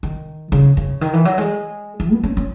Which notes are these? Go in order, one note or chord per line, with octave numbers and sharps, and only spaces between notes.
D#3
C#3
C#3
D#3
E3
F#3
G#3
E3
B3
C#4
C#4